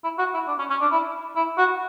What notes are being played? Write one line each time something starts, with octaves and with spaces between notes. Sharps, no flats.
E4
F#4
E4
D4
C#4
C#4
D4
E4
E4
F#4